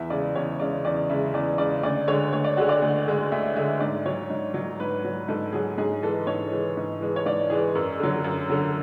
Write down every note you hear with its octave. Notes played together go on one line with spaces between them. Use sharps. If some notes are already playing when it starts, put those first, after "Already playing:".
Already playing: E2 E5
C#3 G#3 D5
E2 C#5
C#3 G#3 D5
E2 D5
C#3 G#3 E5
E2 D5
C#3 G#3 D5
D2 D5
D3 G#3 C#5
D2 C#5
D5
D3 G#3 F#4
D5
D2
D3 G#3
D2 E5
D3 G#3 E5
G#2 D5
F#3 C#5
G#2
F#3
G#2 B4
F#3
G#2 A4
F#3 G#4
G#2 G#4
E3 G#3 A4
G#2 C#5
E3 G#3
G#2
E3 G#3
C#5
G#2 D5
E3 G#3 G#4
F#2
D3 F#3
F#2
D3 F#3